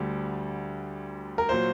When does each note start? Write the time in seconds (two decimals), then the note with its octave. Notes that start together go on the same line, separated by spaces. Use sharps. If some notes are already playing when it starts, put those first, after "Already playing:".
Already playing: D2 D3 G3
1.38 A#4
1.49 A#2 F#3 C5